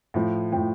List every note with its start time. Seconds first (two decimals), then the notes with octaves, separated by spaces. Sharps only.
0.14 A2 F3
0.52 A2 F3 G5